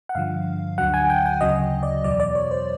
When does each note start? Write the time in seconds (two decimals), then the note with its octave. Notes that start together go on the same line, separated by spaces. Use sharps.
0.09 F#5
0.15 G2 D3 F3 F5
0.78 D2 D3 F#3 F#5
0.94 G#5
1.10 G5
1.26 G5
1.41 D2 C#3 F#3 D#5
1.83 D5
2.04 E2 B2 F#3 D5
2.20 D5
2.35 C#5
2.51 C5